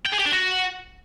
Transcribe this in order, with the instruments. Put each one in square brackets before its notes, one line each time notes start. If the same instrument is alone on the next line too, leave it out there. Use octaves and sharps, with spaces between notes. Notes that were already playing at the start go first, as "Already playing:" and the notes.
[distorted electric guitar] G5
G#4
G4
D4
F#4